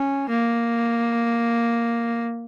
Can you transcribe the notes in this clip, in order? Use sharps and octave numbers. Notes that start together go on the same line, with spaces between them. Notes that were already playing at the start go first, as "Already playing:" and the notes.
Already playing: C#4
A#3